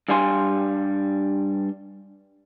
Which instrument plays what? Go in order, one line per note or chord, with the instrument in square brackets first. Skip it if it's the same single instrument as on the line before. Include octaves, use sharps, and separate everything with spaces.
[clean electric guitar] G2 G3 F5 G#5 C6